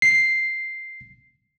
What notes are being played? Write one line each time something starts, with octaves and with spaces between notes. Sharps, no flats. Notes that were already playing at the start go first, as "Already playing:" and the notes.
C7